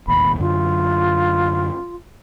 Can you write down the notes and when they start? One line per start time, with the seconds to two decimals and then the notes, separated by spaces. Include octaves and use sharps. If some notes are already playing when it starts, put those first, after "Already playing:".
0.08 E1 A1 D#2 B5
0.40 F#2 D3 F#3 F4